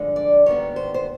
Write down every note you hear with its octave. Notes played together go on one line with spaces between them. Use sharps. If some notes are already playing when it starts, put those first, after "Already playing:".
Already playing: G2 D3 F3 G#3
D5
G#2 D#3 G3 B3 C#5
C5
C5